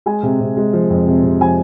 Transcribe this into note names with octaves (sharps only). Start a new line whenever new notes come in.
G#3 G#5
C3
C3
G#3
F3
F2
C3
C3
F3 G#5